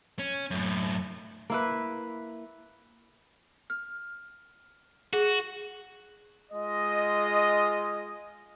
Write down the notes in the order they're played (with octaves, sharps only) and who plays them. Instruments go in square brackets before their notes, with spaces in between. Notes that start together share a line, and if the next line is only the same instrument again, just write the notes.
[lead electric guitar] C#4
F#2 A2
[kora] A#3 E4 B4
[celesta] F6
[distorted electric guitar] F#4 [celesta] G#4
[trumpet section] G#3 F4 D#5